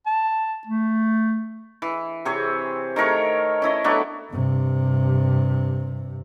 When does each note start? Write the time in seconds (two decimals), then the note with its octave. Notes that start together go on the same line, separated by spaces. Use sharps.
0.06 A5
0.67 A3
1.82 E3
2.25 C3 C4 G#4 C#5
2.96 D#3 A3 A#4 C#5
3.62 C#4 E4 D#5
3.84 F#3 A3 B3 D4
4.32 G2 C3